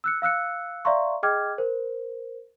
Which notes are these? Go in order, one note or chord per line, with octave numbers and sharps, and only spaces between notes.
E6 F#6 C#7
F5 E6 F#6 C#7
D5 E5 F5 A#5 C6 C#6
G#4 D#5 G5 D6 F6 G#6
A#4 C5